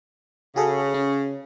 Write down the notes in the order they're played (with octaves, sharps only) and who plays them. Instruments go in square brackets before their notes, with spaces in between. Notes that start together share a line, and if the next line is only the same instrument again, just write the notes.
[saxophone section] C#3 [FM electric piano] F#4 G#4 A4
[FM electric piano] C#4